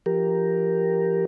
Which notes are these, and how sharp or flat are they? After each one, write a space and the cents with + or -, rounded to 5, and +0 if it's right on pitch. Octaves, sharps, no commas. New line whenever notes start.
F3 -25 G4 +0 A#4 +0